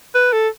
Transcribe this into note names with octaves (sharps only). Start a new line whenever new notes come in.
B4
A4